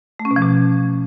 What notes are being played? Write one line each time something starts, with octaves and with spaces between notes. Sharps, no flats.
A3
C#4
B2
F3
B2